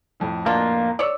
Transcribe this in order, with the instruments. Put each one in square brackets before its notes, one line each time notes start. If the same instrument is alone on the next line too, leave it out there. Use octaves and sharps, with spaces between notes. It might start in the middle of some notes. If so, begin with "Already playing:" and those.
[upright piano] F2 A2
[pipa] B2 D4 F4 [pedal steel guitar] A#3
[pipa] C#5 D5 [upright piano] E6 C#7